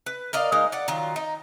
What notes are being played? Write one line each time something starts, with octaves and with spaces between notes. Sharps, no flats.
B4
A#4 D5 D#5 F5
G#3 A#3 D#4 F4
D5 F#5
D#3 F#3 F4
D#4